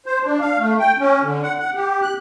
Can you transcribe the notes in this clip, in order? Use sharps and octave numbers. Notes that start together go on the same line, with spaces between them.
C5
D4
F5
A3
G5
C#4
D3
F#5
F#5
G4
F#6